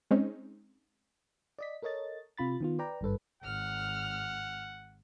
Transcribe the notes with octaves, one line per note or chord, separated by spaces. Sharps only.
G#3 C4 C#4 D#4
D5 D#5 B6
A4 A#4 C#5 D#5 A6
C3 F4 B5 A6
D#3 B3 F4
B4 D5 G5 A#5
G#1 G2 A4 B4
G#1 F#5 F6